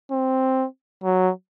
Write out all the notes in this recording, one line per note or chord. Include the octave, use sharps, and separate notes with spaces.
C4
F#3